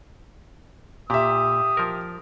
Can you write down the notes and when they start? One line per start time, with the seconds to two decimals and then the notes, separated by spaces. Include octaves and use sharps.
1.10 A#2 G4 E5 D#6
1.77 F3 A#4